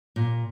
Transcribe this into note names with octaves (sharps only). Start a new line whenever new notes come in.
A#2